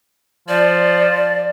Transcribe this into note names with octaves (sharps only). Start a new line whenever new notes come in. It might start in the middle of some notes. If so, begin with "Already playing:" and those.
F3 D5